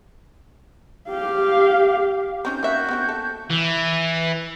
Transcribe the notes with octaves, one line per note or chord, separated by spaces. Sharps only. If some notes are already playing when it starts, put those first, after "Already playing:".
G4 F5
C4 C#4 D#4 G6
A#3 F#4 E5
B3 C4 D4
A4
E3